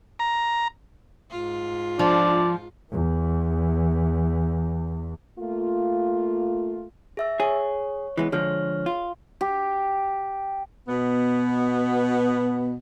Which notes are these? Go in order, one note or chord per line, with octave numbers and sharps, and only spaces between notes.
A#5
G#2 F4
F3 D4 D5
E2 E3
A3 A#3 F4
G#4 E5 E6
G#4 C#5
E3 G#3 B3
D3 F3 G#3 G#4 C#5 F6
F4
G4
B2 B3